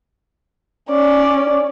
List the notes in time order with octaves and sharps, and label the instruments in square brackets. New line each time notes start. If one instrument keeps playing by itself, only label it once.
[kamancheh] C#4 D5